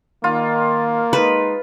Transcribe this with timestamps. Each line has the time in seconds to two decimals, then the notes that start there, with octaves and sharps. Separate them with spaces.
0.24 D#3 A#3 F4
1.13 G#3 D#4 B4